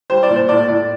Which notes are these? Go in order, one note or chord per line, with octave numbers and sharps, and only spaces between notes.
G3 C5
D5
A#2
C5
A2 D5
A2 D5